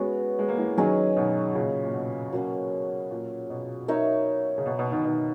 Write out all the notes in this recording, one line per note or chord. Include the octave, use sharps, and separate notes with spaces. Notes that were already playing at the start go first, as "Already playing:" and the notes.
Already playing: G#3 B3 C#4 F#4 B4
G#3
A#3
E3 G#3
D#3 F#3 C#4 G#4 D#5
B2 D#3
A#2 C#3
A#2
B2
F#3 A#3 C#4
A#2
B2
D#4 A#4 C#5 E5
C#3
B2
B2
B2 D#3
B2 D#3